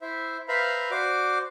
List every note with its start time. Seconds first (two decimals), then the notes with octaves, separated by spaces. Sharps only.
0.02 E4 C5 E5
0.48 B4 C5 E5 F5 A#5 B5
0.91 F#4 C5 D5 D6